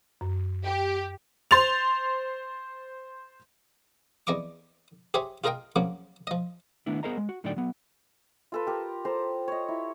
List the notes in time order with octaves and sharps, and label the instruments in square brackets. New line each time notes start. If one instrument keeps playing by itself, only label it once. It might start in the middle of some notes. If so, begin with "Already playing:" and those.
[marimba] F#2
[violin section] G4
[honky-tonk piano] C5 C6 A6 F7
[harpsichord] E2 D5 D#5 C#6 D6
G4 G#4 C5 C#5 E5 G#5
F4 G#4 A#4 D#5 F5 G5
C#3 F3 F#3 A#3
F3 D#5
[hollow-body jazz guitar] D#3 A3 B3 D4 E4
B3 G#4 A#4 C5 D#5 A#5
G#3
F#4
A2 D3 F#3 D#4 D5 G5
F#3 B3
[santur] F4 A4 B4
G4 A#4
A4 C5 A#5
C#5 D#5
E4